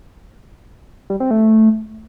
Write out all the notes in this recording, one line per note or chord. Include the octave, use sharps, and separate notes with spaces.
G3
C4
A3